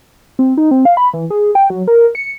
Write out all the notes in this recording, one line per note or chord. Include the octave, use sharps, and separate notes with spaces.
C4
D#4
C4
F5
B5
E3
G#4
G5
F#3
A#4
C#7